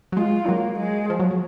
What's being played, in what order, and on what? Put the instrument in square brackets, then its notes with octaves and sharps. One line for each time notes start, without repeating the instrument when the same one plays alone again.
[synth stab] F#3
[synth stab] G#3 [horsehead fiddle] F4
[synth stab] F#3 [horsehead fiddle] A#3
[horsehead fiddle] G#3
[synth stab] F3
F#3
F#3